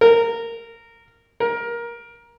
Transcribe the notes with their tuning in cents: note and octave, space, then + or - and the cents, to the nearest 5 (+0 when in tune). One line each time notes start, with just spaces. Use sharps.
A#4 -15
A#4 +15